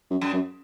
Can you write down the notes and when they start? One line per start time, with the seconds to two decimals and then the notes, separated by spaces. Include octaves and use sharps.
0.10 F#2
0.21 F#2
0.33 F#2